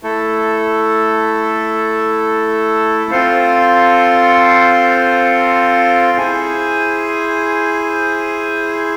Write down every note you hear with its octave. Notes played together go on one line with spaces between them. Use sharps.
A3 E4 A4
C4 F4 A4 C5 F5
E4 G#4 C5 G#5